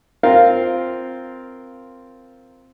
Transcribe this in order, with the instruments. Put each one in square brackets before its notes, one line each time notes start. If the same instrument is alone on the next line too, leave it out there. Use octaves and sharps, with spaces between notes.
[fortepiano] C4 F4 A#4 F5